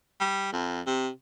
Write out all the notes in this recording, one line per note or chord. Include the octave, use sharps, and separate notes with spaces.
G3
F2
C3